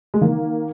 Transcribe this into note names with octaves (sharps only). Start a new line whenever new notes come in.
G#3
D#3 A#3